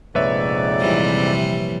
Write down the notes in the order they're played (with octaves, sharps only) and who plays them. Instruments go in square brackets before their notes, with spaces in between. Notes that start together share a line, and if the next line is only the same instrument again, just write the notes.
[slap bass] F1 A#1 [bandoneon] F2 G#2 D5 [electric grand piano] B4 C#5 E5
[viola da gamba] C3 E3 G3